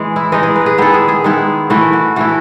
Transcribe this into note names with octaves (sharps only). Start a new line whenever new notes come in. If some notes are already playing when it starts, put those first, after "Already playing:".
Already playing: E3 G#3 G#4
E4
E3 G#3 D#4 D#5
G#4
B4
G#4
D#3 G#3 B3 E4 A4
G#4
G#4
D#3 G#3 B3 E4
E3 A3 E4 F#4
F#4
E3 A3 E4 F#4